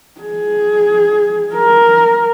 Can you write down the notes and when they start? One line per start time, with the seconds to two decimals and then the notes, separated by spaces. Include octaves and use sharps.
0.21 G#4
1.54 A#4